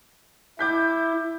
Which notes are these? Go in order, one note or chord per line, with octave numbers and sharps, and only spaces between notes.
E4 D6 G6 B6